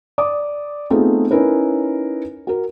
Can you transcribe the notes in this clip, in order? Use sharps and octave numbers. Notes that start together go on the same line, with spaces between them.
D5 D6 D#6
A3 B3 C4 D#4 F4 G#4
C#4 D#4 E4 A#4 B4
F#4 A#4